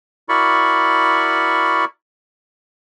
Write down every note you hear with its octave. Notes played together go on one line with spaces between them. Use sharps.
E4 F#4 A#4 D5 B5 C#6